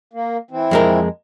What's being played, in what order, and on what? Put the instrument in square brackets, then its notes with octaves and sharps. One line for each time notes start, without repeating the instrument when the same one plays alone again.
[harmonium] A#3
E3 C4
[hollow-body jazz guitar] F2 G#3 A#4